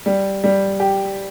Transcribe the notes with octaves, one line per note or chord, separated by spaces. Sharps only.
G3
G3
G4